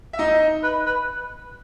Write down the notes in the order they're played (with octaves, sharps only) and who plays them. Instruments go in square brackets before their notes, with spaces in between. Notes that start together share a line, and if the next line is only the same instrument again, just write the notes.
[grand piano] E5
D#4 D#5
[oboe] B4
B4